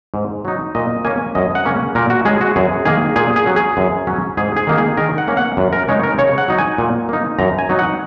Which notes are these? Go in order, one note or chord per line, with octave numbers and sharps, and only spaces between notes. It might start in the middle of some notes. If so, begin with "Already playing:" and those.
G#2
F#3 D#4
A#2 D#5
A#3 C#4 G#5
F#2 D#5
F#5
C#3 A#3 C#4
A#2 A#4
F#4
G#3 C#4 G#4
F#4
F#2 G#4
D#3 A#3 G#4
A#2 G#4
G#4
F#3 C#4
G#4
F#2
F#3 C#4
G#2 G#4
G#4
D#3 A#3 D#4
G#4
D#3 A#4
F#5
A#3 C#4
F#5
F#2
A#4
C#3 G#3 D#4 C#5
A#4
C#3 C#5
F#5
F#3 D#4
G#5
A#2
A#3 D#4
F#2 A#5
G#5
F#3 D#4
F#5